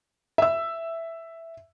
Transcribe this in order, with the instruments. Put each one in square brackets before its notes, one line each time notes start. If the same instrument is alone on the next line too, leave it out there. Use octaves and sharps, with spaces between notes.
[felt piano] E5 E6